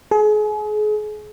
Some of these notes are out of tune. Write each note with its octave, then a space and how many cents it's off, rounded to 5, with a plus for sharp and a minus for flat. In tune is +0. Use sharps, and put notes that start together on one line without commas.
G#4 +35